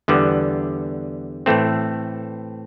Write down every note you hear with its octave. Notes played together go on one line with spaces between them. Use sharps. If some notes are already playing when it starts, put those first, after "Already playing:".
E2 D3 G3 B3
A2 E3 A3 C4